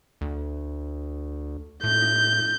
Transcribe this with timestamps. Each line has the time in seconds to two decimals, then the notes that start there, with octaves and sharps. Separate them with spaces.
0.21 D2
1.84 A2 G6